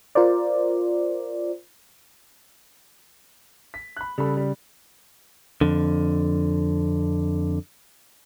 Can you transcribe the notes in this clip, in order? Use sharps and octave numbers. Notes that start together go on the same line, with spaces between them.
F4 A#4 C5 D5
B6
B5 F#6
C#3 G3 A4 B5
G3
F2 D3